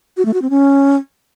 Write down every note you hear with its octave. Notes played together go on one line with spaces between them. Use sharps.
F#4
A3
F#4
C4
C#4